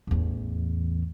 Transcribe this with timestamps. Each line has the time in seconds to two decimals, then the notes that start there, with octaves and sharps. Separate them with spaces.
0.07 A1 E2